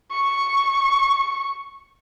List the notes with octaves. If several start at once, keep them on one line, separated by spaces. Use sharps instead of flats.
C#6